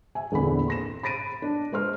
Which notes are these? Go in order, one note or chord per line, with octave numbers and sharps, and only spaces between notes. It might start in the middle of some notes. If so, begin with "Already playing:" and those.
E5 G#5
A#1 E2 D3 C4 B5
C6 A#6 E7
B5 A6 A#6 D7 D#7
D4
G#3 C5 C6 F6